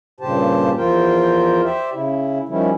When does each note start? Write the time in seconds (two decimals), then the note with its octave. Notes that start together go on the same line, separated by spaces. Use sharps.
0.20 G2 A#2 C#3 G4 C5 A5
0.76 E2 F3 F4 A#4 C5 G5
1.63 G4 C5 D5 E5
1.93 C#3 E4
2.49 D#3 F3 G3 C#4 E4